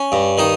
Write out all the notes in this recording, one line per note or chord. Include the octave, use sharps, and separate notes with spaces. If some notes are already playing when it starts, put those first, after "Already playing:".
Already playing: C#4
G2
D#3 D#4